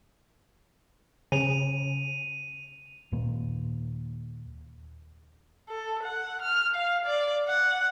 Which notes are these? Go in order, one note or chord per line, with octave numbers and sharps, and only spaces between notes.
C#3 D#7 F7
D#2 A#2 D#3 A#3
A4
F#5
F6
F5
D5
F#5